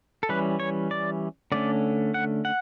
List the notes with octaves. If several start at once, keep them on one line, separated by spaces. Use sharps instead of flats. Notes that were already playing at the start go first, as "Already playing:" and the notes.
A4
E3 G3 C#4 B4
C#5
D5
D3 A3 C#4 D5
F#5
F#5